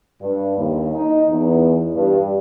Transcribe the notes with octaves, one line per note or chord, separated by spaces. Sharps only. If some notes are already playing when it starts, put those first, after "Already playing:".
G2
D#2
D#4
E2
G2